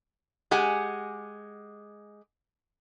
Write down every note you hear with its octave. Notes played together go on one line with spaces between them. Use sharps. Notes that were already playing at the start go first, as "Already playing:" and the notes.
G#3 G4 F#5 G#5